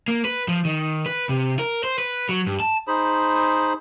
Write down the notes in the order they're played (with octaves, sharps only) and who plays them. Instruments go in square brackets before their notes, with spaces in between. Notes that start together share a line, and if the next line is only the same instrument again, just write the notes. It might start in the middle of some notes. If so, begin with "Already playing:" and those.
[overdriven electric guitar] A#3
B4
F3
D#3
B4
C3
A#4
C5
B4
F#3
G2
A5
[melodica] D#4 G#4 C5 B5